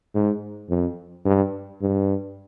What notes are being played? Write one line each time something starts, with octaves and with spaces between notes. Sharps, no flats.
G#2
F2
G2
G2